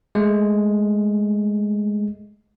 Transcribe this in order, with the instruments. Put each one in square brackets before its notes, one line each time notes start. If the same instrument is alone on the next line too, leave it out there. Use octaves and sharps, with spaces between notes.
[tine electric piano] G#3 A3